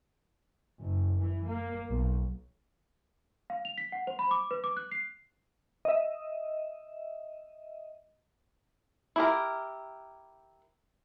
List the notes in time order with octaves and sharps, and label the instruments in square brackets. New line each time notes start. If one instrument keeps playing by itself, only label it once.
[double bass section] F#1
E3
A#3
B1
[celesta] F5
F7
B6
F#5
C5
B5
D6
B4
D6
F#6
C7
[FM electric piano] D#5 E5
[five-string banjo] E4 G4 A#4